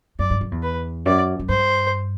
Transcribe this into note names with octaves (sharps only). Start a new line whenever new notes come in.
F#2 D5
G2
F#2
E2
B4
F#2 D5
F#2
G2 C5